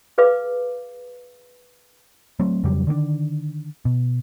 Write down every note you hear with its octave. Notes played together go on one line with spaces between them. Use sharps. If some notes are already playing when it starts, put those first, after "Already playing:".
G#4 B4 F5 D6
F#3 A3 C4
F2 C#3 F#3 G3
D3 D#3 A#3 D4
B2